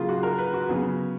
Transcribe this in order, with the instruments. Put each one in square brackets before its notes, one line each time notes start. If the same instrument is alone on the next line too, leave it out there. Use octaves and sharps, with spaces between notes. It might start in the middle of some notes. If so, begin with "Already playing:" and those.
Already playing: [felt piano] C#3 F#3 A#3 F4 G#4
F#4
A#4
B4
F#4
C#3 F#3 B3 G#4